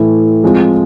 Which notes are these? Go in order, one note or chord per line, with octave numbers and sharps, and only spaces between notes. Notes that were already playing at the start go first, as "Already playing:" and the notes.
Already playing: A2 E3 A3 E4
F3 G#3 C4 F4